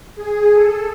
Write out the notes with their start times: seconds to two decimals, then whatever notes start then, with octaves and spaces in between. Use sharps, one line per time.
0.16 G#4
0.53 A4